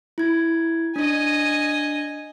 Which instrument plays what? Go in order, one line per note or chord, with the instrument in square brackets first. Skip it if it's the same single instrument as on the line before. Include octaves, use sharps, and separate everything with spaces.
[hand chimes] E4 G#6
[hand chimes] D4 [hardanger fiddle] D#5 G#5